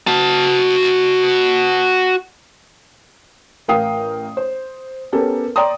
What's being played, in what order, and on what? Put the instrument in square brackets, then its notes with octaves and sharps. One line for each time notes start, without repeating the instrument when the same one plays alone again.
[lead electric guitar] F#4 A5
[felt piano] A1 A#4 F5 G5 D#6 C7
C5
B3 C#4 G4 A4 A#4
D5 G5 A#5 C6 D#6